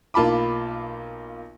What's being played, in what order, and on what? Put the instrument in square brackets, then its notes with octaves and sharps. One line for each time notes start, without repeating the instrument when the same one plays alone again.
[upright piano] B1 A#3 F4 A5 B5 D6